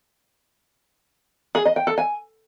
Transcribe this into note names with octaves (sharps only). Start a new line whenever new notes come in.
G#4
D#5
G5
A4
G#5